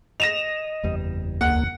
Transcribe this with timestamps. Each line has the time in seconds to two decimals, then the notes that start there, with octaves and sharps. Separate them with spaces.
0.20 D#5 A#6 E7 F7
0.83 F#1 E2 G3
1.41 D2 A#3 F#5